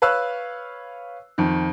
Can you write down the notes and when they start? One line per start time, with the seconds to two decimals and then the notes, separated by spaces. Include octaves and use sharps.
0.02 B4 C#5 F5 E6 F#6
1.38 F2 D#3